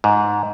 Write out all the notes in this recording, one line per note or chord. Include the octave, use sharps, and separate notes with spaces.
G#2